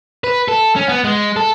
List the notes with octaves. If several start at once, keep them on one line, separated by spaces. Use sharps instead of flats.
B4
A4
C#4
B3
G#3
A4